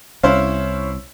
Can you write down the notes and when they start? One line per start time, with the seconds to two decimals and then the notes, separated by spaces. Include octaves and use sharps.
0.23 C2 C#4 E4 C5 F5